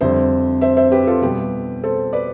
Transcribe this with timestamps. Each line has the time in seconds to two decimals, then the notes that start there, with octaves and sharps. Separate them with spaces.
0.01 F2 D3 G3 C5 E5
0.61 C5 E5
0.77 C5 E5
0.92 G4 B4
1.07 F4 A4
1.22 B2 G3 G4 B4
1.84 A4 C5
2.13 B4 D5